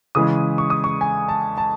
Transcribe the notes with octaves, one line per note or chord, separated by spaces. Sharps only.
C#3 E3 G#3 D#6
C#6
D#6
C#6
G#5
A5
A5